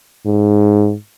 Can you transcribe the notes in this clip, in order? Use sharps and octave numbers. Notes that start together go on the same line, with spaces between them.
G#2